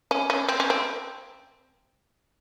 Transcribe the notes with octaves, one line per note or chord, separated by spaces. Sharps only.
C#4
C#4
C4
C#4
C4